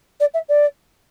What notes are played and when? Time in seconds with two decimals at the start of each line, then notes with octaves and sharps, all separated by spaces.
0.20 D5
0.34 E5
0.49 D5